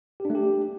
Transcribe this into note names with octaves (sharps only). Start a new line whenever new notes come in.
G4
D4
A3
G4